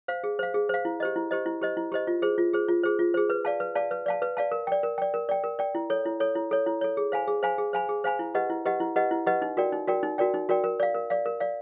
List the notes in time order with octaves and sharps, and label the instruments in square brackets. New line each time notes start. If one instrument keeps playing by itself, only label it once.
[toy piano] C5 F5
G#4
C5 F5
G#4
C5 F5
E4
G4 C5 D#5
E4
G4 C5 D#5
E4
G4 C5 D#5
E4
G4 C5 D#5
F4
G#4 C5
F4
G#4 C5
F4
G#4 C5
F4
G#4 C5
B4
D5 F5 A5
B4
D5 F5 A5
B4
D5 F5 A5
B4
D5 F5 A5
A#4
D5 G5
A#4
D5 G5
A#4
D5 G5
A#4
D5 G5
E4
A4 C#5
E4
A4 C#5
E4
A4 C#5
E4
A4 C#5
G#4
C5 F5 G#5 B5
G#4
C5 F5 G#5 B5
G#4
C5 F5 G#5 B5
G#4
C5 F5 G#5 B5
E4
G4 B4 D#5 F#5
E4
G4 B4 D#5 F#5
E4
G4 B4 D#5 F#5
E4
G4 B4 D#5 F#5
D#4
F#4 A#4 D5 G5
D#4
F#4 A#4 D5 G5
D#4
F#4 A#4 D5 G5
D#4
F#4 A#4 D5 G5
A#4
D5 F5
A#4
D5 F5
A#4
D5 F5